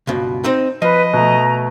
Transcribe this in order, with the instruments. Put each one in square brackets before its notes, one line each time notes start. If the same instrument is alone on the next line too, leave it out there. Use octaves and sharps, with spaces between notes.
[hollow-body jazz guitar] C#2 G2 B2
C4 D#4 C5
[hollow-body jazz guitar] F3 [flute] B4 [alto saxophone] D#5
[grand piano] B2 A3 [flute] A#5